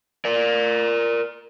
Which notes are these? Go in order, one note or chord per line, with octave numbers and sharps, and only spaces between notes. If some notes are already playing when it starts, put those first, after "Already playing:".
A#4 D5